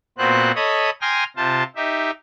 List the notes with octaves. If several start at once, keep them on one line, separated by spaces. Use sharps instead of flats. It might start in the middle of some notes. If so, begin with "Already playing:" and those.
A#2 B3 C4 F#4 C5 F#6
A4 C#5 D#5 B5 D#6
G5 G#5 A#5 C6 D#6 F6
C3 F4 C5 A5
D#4 G4 E5